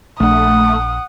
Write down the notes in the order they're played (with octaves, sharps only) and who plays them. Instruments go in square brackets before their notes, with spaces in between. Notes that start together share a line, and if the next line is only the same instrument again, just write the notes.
[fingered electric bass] A#1 D4 [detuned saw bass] A3 [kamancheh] F#5 [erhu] D#6